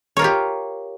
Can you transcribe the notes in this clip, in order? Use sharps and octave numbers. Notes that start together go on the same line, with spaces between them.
F4 G4 A#4 C#5